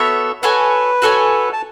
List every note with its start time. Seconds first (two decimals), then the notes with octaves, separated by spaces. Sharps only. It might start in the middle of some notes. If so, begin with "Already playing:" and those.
Already playing: B3 F#4 A4 C#5 E5
0.42 F#4 A4 B4 C#5 G#5
1.02 F#4 A4 C#5 G#5
1.53 A5